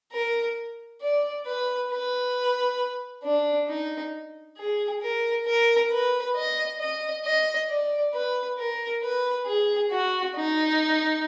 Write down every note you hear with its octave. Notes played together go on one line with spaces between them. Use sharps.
A#4
D5
B4
B4
D4
D#4
G#4
A#4
A#4
B4
D#5
D#5
D#5
D5
B4
A#4
B4
G#4
F#4
D#4